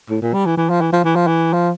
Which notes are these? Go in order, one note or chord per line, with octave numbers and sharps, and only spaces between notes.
A2
A#2
G3
E3
E3
F3
E3
F3
E3
F3
E3
F3